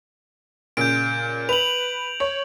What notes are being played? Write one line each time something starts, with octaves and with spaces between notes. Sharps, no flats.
A#2 C#3 G6 D7
B4 F7 F#7
C#5